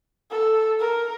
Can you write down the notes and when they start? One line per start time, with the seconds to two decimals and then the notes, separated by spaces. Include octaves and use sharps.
0.31 A4
0.80 A#4